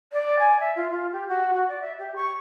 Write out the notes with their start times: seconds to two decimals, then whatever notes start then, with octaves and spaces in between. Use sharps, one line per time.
0.13 D5
0.39 G#5
0.60 E5
0.76 F4
0.90 F4
1.12 G4
1.28 F#4
1.53 F#4
1.68 D5
1.81 E5
1.99 G4
2.16 C#6